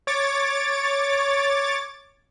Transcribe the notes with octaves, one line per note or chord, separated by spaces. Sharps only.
C#5 D6 A6